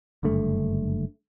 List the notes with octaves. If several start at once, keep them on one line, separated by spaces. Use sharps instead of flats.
F#1 G2 D3 A3